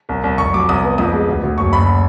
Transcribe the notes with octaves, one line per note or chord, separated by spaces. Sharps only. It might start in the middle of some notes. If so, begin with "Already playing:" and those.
C2
C2
F1 C#6
F#3 D6
C2 D#6
B3
F2 D#6
G#3
D2
D2
F#1 C#6
F#1 B5